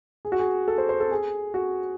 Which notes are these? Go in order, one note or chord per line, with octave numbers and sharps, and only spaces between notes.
G#4
F#4
G#4
A4
C5
C5
A4
G#4
F#4